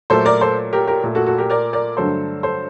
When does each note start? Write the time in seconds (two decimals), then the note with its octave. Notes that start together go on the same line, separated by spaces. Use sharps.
0.10 A#2 F#3 A3 A4 C5
0.25 A#4 D5
0.41 A4 C5
0.73 G4 A#4
0.87 G4 A#4
1.04 A#2 A3
1.15 F#4 A4
1.27 F#4 A4
1.38 G4 A#4
1.50 A#4 D5
1.73 A#4 D5
1.97 G2 D3 F#3 A3 A4 C5
2.43 A4 C5